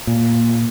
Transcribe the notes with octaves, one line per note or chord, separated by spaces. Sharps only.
A#2